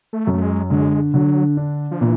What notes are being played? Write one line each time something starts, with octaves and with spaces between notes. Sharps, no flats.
A3
F#2
A3
G#3
D3 G#3
D3 F#3
D4
F3
A#2 E3